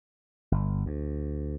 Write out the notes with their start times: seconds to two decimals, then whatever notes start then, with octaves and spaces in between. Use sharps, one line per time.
0.52 G1
0.86 D2